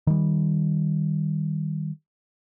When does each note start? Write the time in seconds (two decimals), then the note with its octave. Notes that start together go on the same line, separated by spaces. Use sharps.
0.07 D#3 G3